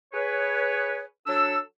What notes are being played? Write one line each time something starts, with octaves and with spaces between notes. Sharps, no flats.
G#4 B4 C#5
F#3 D4 A4 E6